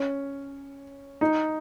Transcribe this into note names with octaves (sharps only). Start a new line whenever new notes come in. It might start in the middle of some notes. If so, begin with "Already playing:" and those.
Already playing: C#4
D#4